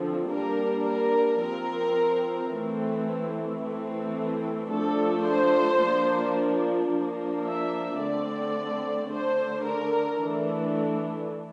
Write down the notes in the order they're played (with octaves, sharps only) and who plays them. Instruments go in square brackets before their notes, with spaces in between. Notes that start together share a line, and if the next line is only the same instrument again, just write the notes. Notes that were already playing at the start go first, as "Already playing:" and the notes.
Already playing: [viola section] D3 F3 C4
G3 A#3 D4 A#4
A#4
F3 C4 A#4
E3 A3 C4
E3 A3 C4
F3 A3 D4 A4
C5
F3 A#3 D4
F3 A#3 D4
E5
D3 A3 C4 D5
D3 A3 D4 C5
A#4
E3 A3 D4